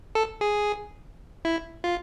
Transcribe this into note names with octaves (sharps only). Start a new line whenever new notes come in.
A4
G#4
E4
F4